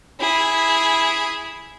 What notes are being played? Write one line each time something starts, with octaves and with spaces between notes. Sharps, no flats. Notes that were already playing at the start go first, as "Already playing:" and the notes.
E4 G#4